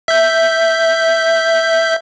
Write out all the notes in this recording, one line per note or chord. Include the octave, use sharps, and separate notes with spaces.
E5 G6